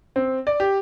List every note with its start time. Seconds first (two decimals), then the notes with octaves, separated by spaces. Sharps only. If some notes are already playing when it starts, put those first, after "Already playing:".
0.16 C4
0.47 D5
0.60 G4